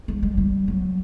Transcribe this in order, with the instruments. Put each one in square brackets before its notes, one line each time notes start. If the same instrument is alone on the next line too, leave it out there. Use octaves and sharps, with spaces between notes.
[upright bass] G#3
G3
G3
F#3